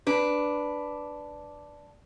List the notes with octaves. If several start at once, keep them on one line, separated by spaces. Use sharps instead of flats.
D4 B4